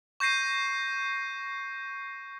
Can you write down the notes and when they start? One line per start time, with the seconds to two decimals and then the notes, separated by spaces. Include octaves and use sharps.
0.20 C#6 G6 A#6 C7 D#7